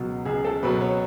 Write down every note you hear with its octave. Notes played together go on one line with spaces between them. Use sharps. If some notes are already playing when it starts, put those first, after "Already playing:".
Already playing: C#2 B2 F#3
C#2 G#4
A4
B2 F#3 B4
C#5